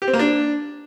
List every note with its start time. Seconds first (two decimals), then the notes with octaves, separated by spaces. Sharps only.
0.02 G4
0.08 C4
0.13 A#3
0.19 D4